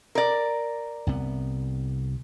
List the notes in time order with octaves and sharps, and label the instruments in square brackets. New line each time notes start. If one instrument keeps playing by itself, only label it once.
[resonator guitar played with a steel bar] A#4 D5
[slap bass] C2 C3 B3